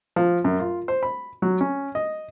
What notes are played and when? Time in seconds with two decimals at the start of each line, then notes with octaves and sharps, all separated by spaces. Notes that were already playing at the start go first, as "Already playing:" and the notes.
0.16 F3
0.44 F#2
0.60 F4
0.88 C5
1.03 B5
1.42 F#3
1.61 C#4
1.95 D#5